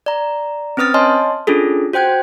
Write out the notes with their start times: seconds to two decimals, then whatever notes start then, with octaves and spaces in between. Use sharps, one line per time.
0.06 D5 A#5
0.77 C4 C#4 B4 D#6 F6 A6
0.94 C#5 D#5 G#5 A5 C6
1.47 C#4 D4 F4 G#4 A4
1.93 F#4 C5 G5 F#6 G#6